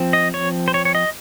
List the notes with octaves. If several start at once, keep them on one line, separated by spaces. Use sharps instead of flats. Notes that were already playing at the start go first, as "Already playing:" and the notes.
Already playing: F3 C4
D#5
C#5
C5
C#5
C#5
D#5